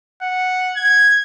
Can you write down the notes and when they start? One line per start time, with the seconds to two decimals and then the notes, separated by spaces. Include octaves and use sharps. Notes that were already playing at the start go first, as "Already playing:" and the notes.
0.22 F#5
0.76 G#6